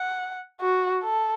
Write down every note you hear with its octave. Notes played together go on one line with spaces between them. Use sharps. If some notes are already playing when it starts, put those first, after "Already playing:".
Already playing: F#5
F#4
A4